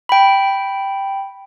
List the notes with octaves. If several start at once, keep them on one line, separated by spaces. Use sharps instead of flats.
G5 B5